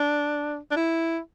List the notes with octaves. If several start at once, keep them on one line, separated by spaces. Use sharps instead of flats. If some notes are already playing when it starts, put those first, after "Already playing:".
Already playing: D4
D4
E4